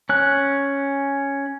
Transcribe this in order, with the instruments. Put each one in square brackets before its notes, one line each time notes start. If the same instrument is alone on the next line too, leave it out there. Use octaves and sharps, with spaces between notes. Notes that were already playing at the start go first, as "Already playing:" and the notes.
[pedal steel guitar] C#4 F#6